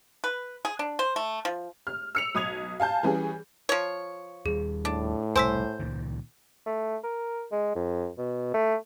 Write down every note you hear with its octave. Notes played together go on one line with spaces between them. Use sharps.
B4
G#4
D4
C5
A3
F3
F6
E6 C#7 F7
B1 D#6 G#6 F7
F5 G#5 A5 G6
E3 G3 C#4 G#4
F3 C#5
D#2 G3 G#4
A2 D4
E1 C2 G3 C5 G#5 E6 B6
C#2 A#2 D#3
A3
A#4
G#3
F2
B2
A3